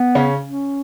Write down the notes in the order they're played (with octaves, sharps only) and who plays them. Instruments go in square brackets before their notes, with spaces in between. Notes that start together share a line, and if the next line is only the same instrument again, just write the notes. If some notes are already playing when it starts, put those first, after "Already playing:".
Already playing: [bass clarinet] B3
[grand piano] C#3 C#4
[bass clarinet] C#4